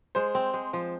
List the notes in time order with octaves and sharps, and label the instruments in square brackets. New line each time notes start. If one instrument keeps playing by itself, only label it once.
[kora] G#3 [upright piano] C5
[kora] C4
G#3
F3